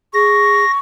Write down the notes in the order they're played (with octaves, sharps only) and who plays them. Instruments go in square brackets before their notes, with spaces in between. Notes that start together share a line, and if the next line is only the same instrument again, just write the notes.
[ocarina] G#4 [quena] C#6 [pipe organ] A#6